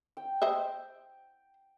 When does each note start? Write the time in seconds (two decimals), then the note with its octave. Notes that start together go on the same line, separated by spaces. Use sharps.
0.17 G5
0.42 C5 D#5 E5